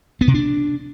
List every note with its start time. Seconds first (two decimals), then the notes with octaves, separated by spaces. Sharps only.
0.21 B3
0.28 C3
0.34 D4